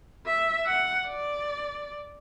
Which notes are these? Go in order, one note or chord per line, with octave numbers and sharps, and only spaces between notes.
E5
F#5
D5